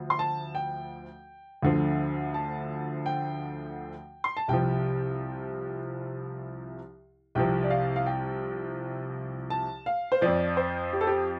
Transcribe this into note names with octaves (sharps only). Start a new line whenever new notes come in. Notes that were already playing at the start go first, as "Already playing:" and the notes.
Already playing: D2 F3
C6
A5
G5
D2 D3 F3
A5
G5
C6
A5
C2 C3 F3 G5
C2 C3 F3 G5
D5
F5
F5
G5
A5
F5
C5
F2 F3 D5
C5
G4
A4
G4